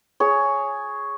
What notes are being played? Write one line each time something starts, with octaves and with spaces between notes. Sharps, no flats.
G#4 C#5